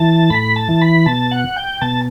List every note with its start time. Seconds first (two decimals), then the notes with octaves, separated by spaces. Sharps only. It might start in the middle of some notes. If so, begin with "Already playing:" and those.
Already playing: E3 A5
0.30 A2 B5
0.56 A5
0.69 E3
0.82 B5
1.06 B2 A5
1.31 F#5
1.56 G5
1.82 B2 A5